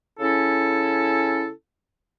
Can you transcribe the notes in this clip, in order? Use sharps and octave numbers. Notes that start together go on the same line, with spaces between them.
C#3 C#4 E4 A4